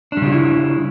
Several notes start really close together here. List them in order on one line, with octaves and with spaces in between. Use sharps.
D4 G3 C#3 F4 E4